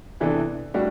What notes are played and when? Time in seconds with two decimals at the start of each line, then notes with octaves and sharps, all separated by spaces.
0.20 C3 E3 B3 D4 A4
0.74 A2 G3 D4 F#4